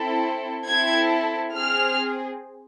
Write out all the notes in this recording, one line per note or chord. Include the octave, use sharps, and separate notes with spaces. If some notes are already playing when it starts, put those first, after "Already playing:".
Already playing: C4 E4 A4
C4 E4 A4 G#6
C4 G#4 F6